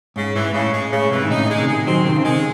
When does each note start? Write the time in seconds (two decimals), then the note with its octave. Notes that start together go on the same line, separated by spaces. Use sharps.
0.16 G#2 C#3
0.35 G#2 E3
0.53 A2 C#3
0.73 G#3
0.92 A2 C#3
1.10 G#2 C3 E3
1.22 D#3
1.30 A2 C#3 D#4
1.49 G#3
1.58 C3 D#3
1.68 G#3
1.86 D#3 F#3 C4
2.05 C3 D#3 C4
2.16 C#3
2.24 C3 D#3 G#3